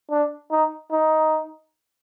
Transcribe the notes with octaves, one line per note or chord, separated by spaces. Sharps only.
D4
D#4
D#4